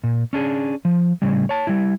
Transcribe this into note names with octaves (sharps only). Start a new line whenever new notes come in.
A#2
C#4 D4 G#4
F3
A2 C#3 G3
C#5 A5
G3 E4